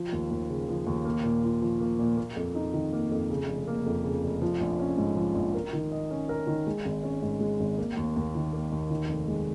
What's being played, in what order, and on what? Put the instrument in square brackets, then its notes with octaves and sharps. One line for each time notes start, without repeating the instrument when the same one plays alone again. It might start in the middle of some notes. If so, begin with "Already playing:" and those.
Already playing: [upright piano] F3
D#2
D#2
C#3
F3
D#2
A#3
A#2
F4
F3
A#3
A#2
A#3
F2
D#4
D#3
A#3
F2
C#3
F1
A#3
F2
C#3
F1
F3
A#1
C#4
G#2
F3
A#1
A#4
D#3
D#5
C#4
A#4
D#3
G#3
G#1
C#4
G#2
G#3
G#1
A#3
D#2
D#2
D#3
A#3
D#2
D#3
F1
G#3